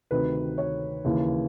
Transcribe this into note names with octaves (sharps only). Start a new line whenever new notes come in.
D2 C3 D#3 B4
C#5
D#2 C#3 E3